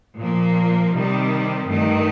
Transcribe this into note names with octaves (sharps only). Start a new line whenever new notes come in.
A#2 F3 A#3
C3 D#3 G3
G2 D#3 A3